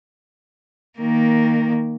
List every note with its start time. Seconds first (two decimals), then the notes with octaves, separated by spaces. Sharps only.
0.99 D#3 A#3